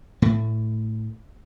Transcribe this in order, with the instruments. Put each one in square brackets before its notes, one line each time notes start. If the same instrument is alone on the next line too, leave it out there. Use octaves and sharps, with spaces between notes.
[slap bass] A2 A3